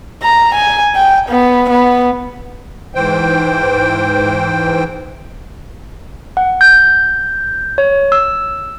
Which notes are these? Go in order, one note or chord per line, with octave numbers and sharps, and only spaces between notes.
A#5
G#5
G5
B3
B3
G#2 E3 C5 G5
F#5
G6
C#5
E6